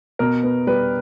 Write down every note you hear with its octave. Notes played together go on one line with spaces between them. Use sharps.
B2 A#4
B3
G3 B4